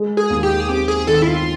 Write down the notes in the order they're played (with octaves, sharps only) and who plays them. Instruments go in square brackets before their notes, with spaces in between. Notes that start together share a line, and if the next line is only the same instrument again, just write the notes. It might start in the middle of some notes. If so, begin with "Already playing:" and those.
Already playing: [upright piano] G#3
[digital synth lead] G#4
[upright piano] D#2
[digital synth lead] G4
G#4
[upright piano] C4 [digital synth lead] G4
[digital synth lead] G#4
[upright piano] D#3 [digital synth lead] A4
[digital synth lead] E4
F4